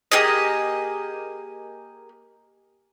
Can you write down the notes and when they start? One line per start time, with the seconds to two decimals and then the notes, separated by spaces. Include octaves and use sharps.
0.12 A#3 G4 G#4 D#5